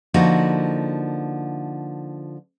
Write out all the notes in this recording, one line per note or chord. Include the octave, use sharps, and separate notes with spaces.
D3 F3 A#3 D#4 F#4